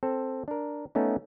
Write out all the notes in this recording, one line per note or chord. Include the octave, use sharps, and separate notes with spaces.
C4 A4
D4 A#4
A3 B3 C#4 D#4